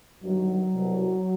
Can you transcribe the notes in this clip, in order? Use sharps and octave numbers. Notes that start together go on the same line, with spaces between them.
G1 G2 D#3 F#3
C2 B2